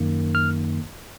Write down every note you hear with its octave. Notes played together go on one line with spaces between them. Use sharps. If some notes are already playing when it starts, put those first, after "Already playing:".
Already playing: F#2 D#3 A#3
F6